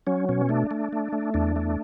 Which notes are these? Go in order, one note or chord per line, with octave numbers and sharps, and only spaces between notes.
F#3 C#4
B2 C#4
A3 D4
A3
A3
A3
E2 D4
A3